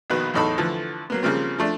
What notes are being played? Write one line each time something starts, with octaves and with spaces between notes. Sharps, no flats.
A#1 B2 D#3 B4
B1 E2 A2 D#4 A4 B5
D3 E3 F3 A3
F#3 A#3 B3
C#3 F3 G3 A#3 C4 F4
F3 A3 D4